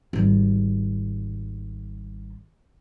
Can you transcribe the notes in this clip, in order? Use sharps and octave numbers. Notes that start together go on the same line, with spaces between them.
G#1 G3